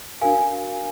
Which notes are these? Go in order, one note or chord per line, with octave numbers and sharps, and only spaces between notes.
D4 F#4 A#4 F5 G#5